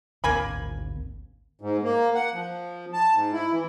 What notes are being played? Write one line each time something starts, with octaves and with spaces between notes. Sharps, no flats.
G#1 D2 A#3 C4 G#5 B5
G#2
A#3
F#5
F3
A5
G#2
E4
E3